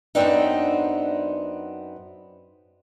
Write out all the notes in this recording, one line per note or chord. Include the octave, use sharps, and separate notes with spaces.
F#2 C#3 B3 C4 D4 D#4